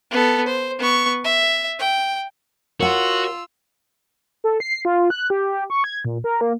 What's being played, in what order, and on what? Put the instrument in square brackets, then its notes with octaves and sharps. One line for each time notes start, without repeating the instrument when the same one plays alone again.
[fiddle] B3 A4
C5
B3 C#6
E5
G5
[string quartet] F4 E6 [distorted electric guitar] F#4 [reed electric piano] A#4 [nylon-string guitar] C#5 F#5
[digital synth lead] A4
C7
F4
F#6
G4
G4
C#6
G#6
A#2
A#4
A#3